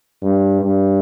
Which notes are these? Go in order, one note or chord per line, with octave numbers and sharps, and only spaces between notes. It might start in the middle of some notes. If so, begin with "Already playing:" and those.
G2
G2